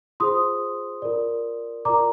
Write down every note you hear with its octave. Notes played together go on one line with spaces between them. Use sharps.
F4 G#4 C5 C6 D#6
F4 A#4 D5
F4 A#4 D5 A#5 D6